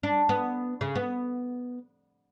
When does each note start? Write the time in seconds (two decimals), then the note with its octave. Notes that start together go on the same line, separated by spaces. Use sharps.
0.03 D4
0.29 B3
0.81 C#3
0.95 B3